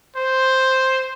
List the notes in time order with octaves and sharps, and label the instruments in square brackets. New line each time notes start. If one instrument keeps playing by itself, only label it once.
[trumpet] C5